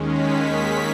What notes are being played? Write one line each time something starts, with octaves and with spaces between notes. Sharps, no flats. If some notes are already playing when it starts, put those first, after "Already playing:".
Already playing: D#2 D#3 G#3 C#4
B6
B6